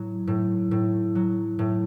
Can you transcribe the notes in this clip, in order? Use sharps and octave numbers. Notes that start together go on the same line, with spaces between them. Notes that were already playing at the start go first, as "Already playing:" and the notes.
Already playing: A2 F#3 C#5
A2
A2
F#3
A2